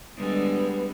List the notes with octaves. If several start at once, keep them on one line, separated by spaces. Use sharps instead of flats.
D3 G3 G#3 B3